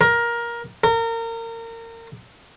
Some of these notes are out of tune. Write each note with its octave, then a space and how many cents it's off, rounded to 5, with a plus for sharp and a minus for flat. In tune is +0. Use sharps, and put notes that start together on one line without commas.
A#4 +15
A#4 -30